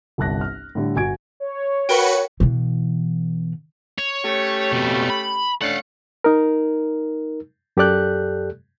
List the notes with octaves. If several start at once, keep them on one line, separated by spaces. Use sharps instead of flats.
G1 C2 A5 F#6 A#6
F6
A2 D3 G3
G1 F#4 G#5 G#6 D7
C#5
F#4 A#4 B4 G5 C#7
B2 E3
C#5
A3 C#4 G4
F2 B2
B5
A3 C#4 D4 F5 F#5
D#4 A#4
F#2 G4 A4 D5 F#6 G6